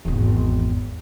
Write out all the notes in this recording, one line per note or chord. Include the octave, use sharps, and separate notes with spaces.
G#1 E2